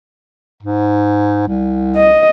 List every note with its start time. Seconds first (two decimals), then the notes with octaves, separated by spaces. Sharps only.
0.63 G#2
1.48 C2
1.96 D#5